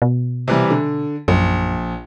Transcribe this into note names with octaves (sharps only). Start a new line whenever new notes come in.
B2
C3 E3 G3
D3
A#1 F#2